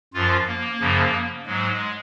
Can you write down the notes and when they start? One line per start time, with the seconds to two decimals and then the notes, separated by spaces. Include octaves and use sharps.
0.14 F#2 F3 F4
0.47 A#3
0.80 F#2 C#3 F3
1.46 G#2 F#3 G#3